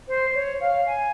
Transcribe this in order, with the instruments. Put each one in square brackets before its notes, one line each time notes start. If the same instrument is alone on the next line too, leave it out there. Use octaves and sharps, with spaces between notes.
[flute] C5
C#5
F5
G#5